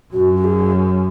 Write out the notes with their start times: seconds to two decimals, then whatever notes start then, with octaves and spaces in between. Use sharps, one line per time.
0.13 F#2 F#4
0.36 F#4
0.44 G#4